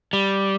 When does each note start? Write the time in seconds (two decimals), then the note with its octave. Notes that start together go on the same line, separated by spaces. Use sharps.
0.13 G3